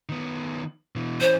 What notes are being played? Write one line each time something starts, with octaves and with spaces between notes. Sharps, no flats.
D#3 B3
B2 E3
E3 C#4 C5